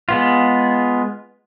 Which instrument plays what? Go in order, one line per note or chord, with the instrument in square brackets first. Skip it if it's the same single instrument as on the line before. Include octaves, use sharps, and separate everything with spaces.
[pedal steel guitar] G#3 B3 F4